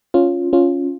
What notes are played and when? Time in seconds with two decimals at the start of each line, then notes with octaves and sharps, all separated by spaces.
0.14 C#4 F4
0.53 C#4 F4